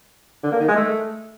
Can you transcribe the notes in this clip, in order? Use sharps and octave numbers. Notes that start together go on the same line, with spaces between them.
D3
A#3
D#3
G#3
A3